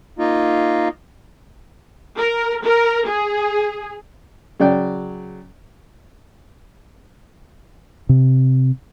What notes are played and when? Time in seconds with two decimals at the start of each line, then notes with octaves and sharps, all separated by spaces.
0.19 A#3 D#4 F4
2.18 A#4
2.64 A#4
3.06 G#4
4.60 C#3 F#3 D5 G5
8.09 C3